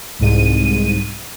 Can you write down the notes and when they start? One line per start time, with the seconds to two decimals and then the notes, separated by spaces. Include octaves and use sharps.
0.19 C2 G#2 D#7